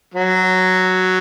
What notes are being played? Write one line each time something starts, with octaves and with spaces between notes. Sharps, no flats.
F#3